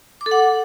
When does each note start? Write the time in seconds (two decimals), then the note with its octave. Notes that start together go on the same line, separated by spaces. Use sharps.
0.21 D6
0.26 A4
0.31 F#5